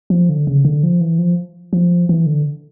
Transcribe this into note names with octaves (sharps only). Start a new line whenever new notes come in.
F3
D3
C#3
D3
F3
E3
F3
F3
E3
D3